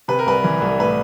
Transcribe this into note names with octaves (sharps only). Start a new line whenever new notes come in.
C3 B4
A#4
C2 B4
E3
C2
A2 B4